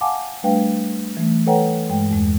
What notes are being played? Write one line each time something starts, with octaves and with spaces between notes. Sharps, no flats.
F5 F#5 G#5 A5 D6
G3 A3 D4 B4 F5 G5
E3 A3
A4 B4 C#5 F#5 G5 A#5
G2 G#3 G5
E2 G#3